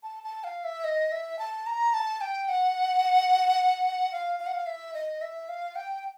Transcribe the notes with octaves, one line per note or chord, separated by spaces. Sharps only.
A5
A5
F5
E5
D#5
E5
A5
A#5
A5
G5
F#5
F5
F5
F#5
F5
E5
D#5
E5
F5
G5